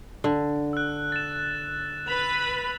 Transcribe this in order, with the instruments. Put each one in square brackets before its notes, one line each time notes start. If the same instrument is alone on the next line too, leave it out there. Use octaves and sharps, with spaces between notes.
[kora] D3
[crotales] E6 F#6
A6 E7
[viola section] B4 B5 [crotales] F7